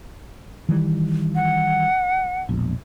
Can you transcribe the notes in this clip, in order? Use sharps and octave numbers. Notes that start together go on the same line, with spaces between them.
D#3 E3 G3
F#5
E1 A#1